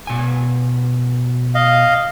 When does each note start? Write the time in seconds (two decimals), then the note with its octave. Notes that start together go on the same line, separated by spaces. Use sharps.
0.07 B2 G#5
1.55 D#5 F5